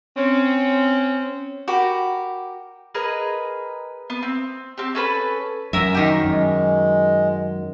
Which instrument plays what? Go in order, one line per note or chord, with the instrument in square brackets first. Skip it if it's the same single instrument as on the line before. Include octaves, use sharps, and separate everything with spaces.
[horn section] C4 C#4
[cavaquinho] F#4 G4 A#4 B5
[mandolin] G#4 A#4 B4 D#5
B3
C4
C4 G4
C#4 A4 B4 B5
[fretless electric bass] F#2 [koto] A#4 E5
[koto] D#3 G4
[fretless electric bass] F#2 [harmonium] G#3